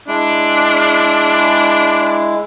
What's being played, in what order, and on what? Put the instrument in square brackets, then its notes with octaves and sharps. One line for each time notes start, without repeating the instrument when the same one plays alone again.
[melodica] G#3 E4 [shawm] D4